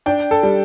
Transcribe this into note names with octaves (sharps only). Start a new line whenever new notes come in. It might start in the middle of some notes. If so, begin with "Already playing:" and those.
D4 G5
A4
G3